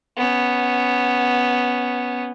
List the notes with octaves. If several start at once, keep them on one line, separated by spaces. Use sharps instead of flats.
B3 C#4